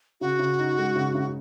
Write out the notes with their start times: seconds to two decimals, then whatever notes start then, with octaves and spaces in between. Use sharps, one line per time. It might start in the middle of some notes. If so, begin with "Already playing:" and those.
0.21 C#3 F#4
0.39 C#3
0.59 D#4
0.78 G#3
0.96 C#3
1.15 C#3